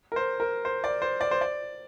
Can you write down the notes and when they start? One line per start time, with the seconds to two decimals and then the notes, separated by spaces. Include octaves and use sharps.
0.12 A#4
0.16 C5
0.40 A#4
0.65 C5
0.84 D5
1.02 C5
1.21 D5
1.31 C5
1.41 D5